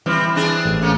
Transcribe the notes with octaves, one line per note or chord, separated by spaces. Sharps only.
E3 G3 C4 E4
C4 D4 G#4
A1
A3 A#3 C#4